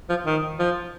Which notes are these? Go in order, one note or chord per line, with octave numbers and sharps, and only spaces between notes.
F3
D#3
F3